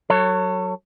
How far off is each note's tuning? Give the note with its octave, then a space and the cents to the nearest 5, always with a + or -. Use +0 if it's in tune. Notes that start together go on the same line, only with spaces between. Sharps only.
F#3 +10 A4 +35 C#5 -5